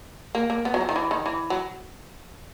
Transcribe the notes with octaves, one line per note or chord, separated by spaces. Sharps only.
A#3
A#3
B3
F#3
F3
D#3
E3
D#3
E3
F#3